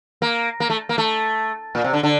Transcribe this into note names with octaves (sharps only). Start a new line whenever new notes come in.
A#3
A#3
A3
A#3
A3
A#2
C3
D3
D3